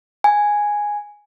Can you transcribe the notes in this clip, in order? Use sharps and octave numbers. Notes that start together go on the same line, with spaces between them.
G#5